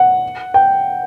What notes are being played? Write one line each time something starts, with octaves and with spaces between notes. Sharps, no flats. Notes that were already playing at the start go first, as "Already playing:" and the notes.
Already playing: F#5
G5